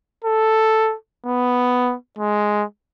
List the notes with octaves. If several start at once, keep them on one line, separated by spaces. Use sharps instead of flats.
A4
B3
G#3